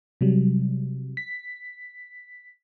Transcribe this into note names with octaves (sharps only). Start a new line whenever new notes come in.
C3 F#3 G3
B6